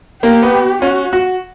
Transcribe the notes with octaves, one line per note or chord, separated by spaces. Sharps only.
A#3 G4
B3
C#4 F#4
F#4